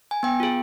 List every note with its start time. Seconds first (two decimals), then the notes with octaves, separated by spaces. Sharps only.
0.11 G#5
0.23 B3 G5
0.40 F4 G#4